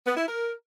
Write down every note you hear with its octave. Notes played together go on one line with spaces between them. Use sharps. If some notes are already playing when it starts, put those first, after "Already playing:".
B3
E4
A#4